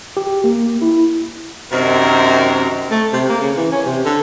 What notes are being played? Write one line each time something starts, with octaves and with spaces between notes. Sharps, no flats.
G4
A#3
E4
F#2 C3 D#3 C4 A#4
A3
C3
A#3
C#3
E3
C#4
C3
D3